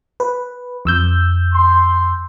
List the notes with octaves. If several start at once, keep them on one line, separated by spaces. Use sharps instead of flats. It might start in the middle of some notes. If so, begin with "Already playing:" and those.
B4
F2 E6 G6
C6